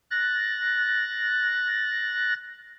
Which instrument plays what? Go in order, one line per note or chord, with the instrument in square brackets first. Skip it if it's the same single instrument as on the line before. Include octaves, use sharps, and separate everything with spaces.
[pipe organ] F#6 A6 A#6